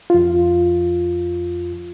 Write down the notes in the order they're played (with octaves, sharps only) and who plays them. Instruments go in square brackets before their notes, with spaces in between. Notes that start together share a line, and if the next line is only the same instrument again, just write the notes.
[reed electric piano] F2 F4